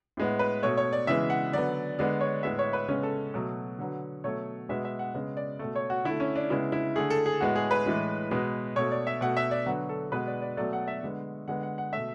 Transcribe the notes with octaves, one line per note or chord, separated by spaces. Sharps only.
A2 G#3 B3
B4
B2 A3 C#5
C#5
D5
C#3 E3 G#3 B3 E5
F#5
D3 F#3 B3 D5
D3 G#3 B3 D5
C#5
A2 G#3 B3 E5
C#5
B4
C#3 G#3 B3 C#4
A4
B2 F#3 A3
D3 F#3 B3
B2 F#3 A3 C#5
B2 G#3 B3 E5
E5
F#5
C#3 G#3 B3
D5
B2 A3
C#5
F#4
D3 A3 E4
C#4
D4
C#3 G#3 B3 E4
E4
D3 A3 G#4
A4
G#4
A2 G#3 B3 F#4
G#4
B4
A2 E3 G#3
B2 G#3 B3
B2 A3 C#5
D5
E5
B2 A3 F#5
E5
D5
D3 F#3 B3 F#4
A4
B2 G#3 B3 B4
D5
D5
B2 F#3 A3 D5
F#5
E5
D3 G#3 B3
D3 G#3 B3 F#5
F#5
F#5
B2 A3 E5